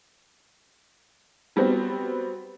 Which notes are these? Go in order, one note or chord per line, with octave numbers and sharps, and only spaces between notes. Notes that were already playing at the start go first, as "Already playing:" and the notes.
F#3 G3 B3 C4 F#4